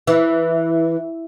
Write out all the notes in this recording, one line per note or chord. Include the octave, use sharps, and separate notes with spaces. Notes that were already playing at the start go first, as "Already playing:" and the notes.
E3